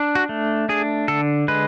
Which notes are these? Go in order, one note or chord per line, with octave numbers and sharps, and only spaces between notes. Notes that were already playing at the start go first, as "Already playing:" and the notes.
Already playing: D4
F#4
A3
D4 G#4
D3 A4
G#3 B4